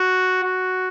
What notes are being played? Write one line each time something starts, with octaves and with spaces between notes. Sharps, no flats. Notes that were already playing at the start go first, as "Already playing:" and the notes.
Already playing: F#4
F#4